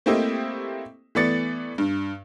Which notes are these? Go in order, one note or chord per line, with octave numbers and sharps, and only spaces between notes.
A3 A#3 C4 E4 G4 D#5
E3 A3 B3 D5 A6 C#7
G2